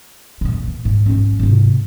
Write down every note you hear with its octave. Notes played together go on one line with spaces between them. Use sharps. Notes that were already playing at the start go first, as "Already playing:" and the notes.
E2 A#2
G#2
G#2 C#4
G#2 C3